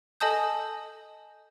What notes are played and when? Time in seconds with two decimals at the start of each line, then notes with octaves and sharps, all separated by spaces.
0.20 A4 D#5 G#5 A5 D#6 G6